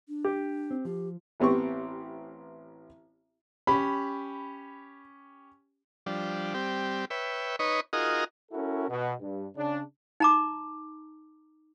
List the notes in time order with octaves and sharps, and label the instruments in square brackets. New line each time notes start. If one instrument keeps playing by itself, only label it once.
[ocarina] D4
[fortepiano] G4
[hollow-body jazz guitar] C4
[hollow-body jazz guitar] F3 [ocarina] G4
[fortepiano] A1 B3 C4 G4 C#6
[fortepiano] C#4 G4 [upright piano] B5
[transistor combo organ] F3 G3 D4
G3 C4 G4
B4 C#5 E5 G5
D#4 B4 C#5 D#5 C#6
D#4 F4 F#4 G#4 A#4 D#5
[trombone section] C#4 E4 F#4 A4 A#4
B2
G2
C#3 D4
[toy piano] D#4 A#5 D6